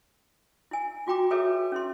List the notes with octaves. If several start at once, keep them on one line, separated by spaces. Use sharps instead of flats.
E4 G#5
F4 F#4 G5 A#5 D6
F#4 G#4 A4 B4 C#5 E5
C#4 E4 C6